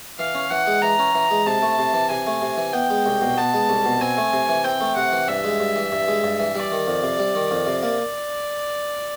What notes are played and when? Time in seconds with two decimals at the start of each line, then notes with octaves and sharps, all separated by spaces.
0.19 E3 F5
0.35 C#4
0.50 E3 F#5
0.67 G#3
0.82 E3 A#5
0.99 C#4
1.15 E3
1.30 G#3
1.46 C3 A5
1.62 A3
1.78 C3
1.94 E3
2.10 C3 G#5
2.27 A3
2.42 C3
2.57 E3
2.73 B3 G5
2.90 G#3
3.06 C2
3.21 B2
3.37 B3 A5
3.53 G#3
3.69 C2
3.85 B2
4.01 C4 G#5
4.17 A3
4.33 C3
4.49 E3
4.64 C4 G5
4.80 A3
4.96 C3 F#5
5.12 E3
5.28 G2 E5
5.44 G#3
5.60 G2
5.76 E3
5.92 G2
6.08 G#3
6.23 G2
6.40 E3
6.55 G3 D5
6.72 D#3
6.87 F2
7.03 C3
7.19 G3
7.35 D#3
7.51 F2
7.67 C3
7.82 A#3 D5